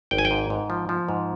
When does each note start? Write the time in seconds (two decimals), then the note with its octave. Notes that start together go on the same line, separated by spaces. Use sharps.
0.11 G#1 G5
0.18 G#5
0.25 G5
0.31 G#2
0.50 G#2
0.70 F3
0.89 F3
1.09 G#2